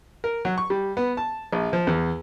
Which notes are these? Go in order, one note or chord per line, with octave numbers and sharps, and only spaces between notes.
A#4
F#3
C#6
G3
B3
A5
A#1
F3
E2